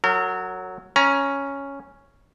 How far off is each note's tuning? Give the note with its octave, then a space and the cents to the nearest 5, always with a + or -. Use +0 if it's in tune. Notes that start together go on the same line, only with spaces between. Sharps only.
F#3 +0 A#4 -40
C#4 +0 A#5 +20